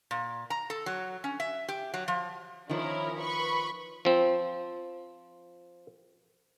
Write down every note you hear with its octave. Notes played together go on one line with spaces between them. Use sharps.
A#2
A#5
A4
F#3
C#4
E5
G4
F#3
F3
D#3 F3 C#4 E4 A#4
B4 B5 C#6
F3 C4